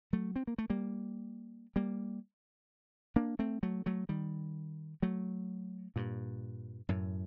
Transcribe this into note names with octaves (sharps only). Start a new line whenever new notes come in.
F#3 A3
C4
A#3
A3
G3 A#3
G3 A#3
A#3 D4
A3 C4
F#3 A3
F#3 A3
D#3 G3
F#3 A3
G2 A#2
F#2 A2